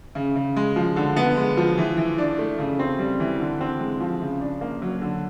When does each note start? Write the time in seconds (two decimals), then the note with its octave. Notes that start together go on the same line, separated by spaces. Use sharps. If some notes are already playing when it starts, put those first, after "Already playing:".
0.15 C#3
0.36 C#3
0.56 G#3
0.76 F3
0.96 D3
1.16 B3
1.37 G#3
1.57 F3
1.78 E3
1.97 E3
2.18 D4
2.39 A3
2.59 C#3
2.79 C4
2.99 G3
3.20 E3
3.40 D3
3.61 C4
3.80 G#3
4.00 F3
4.21 C#3
4.41 D4
4.61 A#3
4.82 F#3
5.02 D3